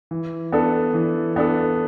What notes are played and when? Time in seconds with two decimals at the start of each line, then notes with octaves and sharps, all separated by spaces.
0.11 E3
0.52 B3 D4 A4
0.94 E3
1.36 B3 D4 A4